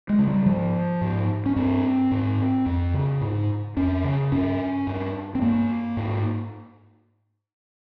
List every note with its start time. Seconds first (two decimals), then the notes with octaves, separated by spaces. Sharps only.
0.09 G#3
0.19 C#3
0.27 G3
0.46 G#2 F3
1.01 G#2
1.46 C#4
1.56 G2 C4
2.11 G#2
2.66 F2
2.94 C#3
3.21 G#2
3.77 F2 C#4
4.04 C#3
4.32 G2 C#4
4.87 G2
5.35 C4
5.42 G2 A#3
5.97 G#2